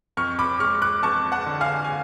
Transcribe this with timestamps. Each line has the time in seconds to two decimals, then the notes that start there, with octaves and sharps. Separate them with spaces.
0.17 F2 C#6 F6
0.39 B5 D6
0.60 G#3 C#6 F6
0.82 D6 F#6
1.03 F2 A5 C#6
1.32 F#5 A5
1.46 D3
1.61 F5 G#5
1.84 G#5